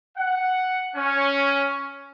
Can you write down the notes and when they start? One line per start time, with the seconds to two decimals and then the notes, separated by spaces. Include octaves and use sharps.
0.18 F#5
0.95 C#4